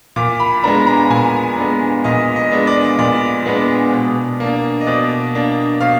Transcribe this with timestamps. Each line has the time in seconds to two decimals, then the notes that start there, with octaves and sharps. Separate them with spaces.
0.16 A#2 D6
0.40 B5
0.63 G#3 B3 D4 A#5
0.87 A#5
1.10 A#2 G#5
1.57 G#3 B3 D4
2.04 A#2 D#5
2.36 D#5
2.52 G#3 B3 D4
2.67 D5
2.99 A#2 D5
3.46 G#3 B3 D4
3.93 B2
4.40 A#3 D4
4.81 D#5
4.87 B2 D5
5.34 A#3 D4
5.80 B2 F5